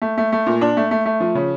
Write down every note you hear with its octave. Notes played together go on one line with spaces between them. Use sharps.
A3
A3
A3
A#2
D4
A3
A3
A3
F3
C#3